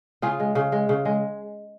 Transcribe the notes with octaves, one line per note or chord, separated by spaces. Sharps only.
C#3 F4 G#4
G#3
C#3
G#3
C#3
G#3